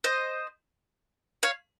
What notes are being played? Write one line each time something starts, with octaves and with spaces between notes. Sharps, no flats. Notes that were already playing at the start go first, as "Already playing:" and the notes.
C5 D#5
C#5 F5